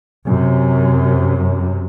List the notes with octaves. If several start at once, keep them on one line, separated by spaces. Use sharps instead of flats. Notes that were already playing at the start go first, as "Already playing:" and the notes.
F#2 C3